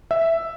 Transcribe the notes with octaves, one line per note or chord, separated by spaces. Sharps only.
E5